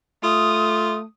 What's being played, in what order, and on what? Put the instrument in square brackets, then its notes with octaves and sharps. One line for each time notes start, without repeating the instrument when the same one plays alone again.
[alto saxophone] A3 [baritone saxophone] F4 [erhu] D#6